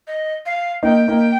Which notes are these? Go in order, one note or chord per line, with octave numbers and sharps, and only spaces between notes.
D#5
F5
A#3 D#4 G5
A#3 D#4